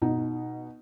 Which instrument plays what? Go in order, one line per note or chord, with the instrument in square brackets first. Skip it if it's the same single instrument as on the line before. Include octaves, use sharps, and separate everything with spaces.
[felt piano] B2 D#4